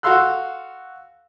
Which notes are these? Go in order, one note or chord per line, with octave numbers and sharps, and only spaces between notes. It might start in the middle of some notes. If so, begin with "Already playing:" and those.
F#4 A4 F5 C6 E6 F#6